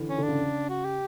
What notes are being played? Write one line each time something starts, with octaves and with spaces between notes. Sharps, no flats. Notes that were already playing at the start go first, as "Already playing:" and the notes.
Already playing: D3 E3
C#4
D3
D4
C#3
F#4
G4